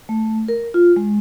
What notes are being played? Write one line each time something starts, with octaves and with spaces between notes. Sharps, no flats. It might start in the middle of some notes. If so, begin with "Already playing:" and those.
A3
A#4
F4
G#3